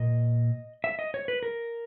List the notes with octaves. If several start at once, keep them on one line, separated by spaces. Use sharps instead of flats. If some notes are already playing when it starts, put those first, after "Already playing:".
Already playing: A#2 D#5
E5
D#5
C#5
B4
A#4